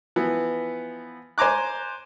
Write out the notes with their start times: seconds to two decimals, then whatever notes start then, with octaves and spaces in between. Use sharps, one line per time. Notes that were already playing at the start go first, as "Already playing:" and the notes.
0.16 E3 F3 B3
1.38 C5 G#5 A#5 D6 F#6